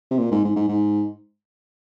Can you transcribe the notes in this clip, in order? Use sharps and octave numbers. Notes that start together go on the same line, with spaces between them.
C3
A#2
G#2
G#2
G#2
G#2